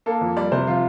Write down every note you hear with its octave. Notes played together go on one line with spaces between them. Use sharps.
A#3 A4
F2
G3 D5
C3 C5
F3 F4